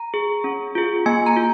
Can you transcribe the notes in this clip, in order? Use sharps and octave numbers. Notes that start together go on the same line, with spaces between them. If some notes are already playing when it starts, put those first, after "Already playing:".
Already playing: A#5
G#4
C#4
F4 G#4
A#3 G#5
A#5
F4